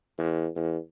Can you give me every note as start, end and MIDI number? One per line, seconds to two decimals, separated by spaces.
0.18 0.48 40
0.56 0.77 40